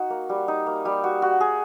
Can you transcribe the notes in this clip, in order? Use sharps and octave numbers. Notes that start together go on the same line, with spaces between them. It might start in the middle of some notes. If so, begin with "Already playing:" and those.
Already playing: D#4 F#4
A#3
G3
D#4
A#3
G3
F#4
F#4
G#4